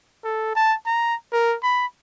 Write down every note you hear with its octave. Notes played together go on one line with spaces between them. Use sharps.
A4
A5
A#5
A#4
B5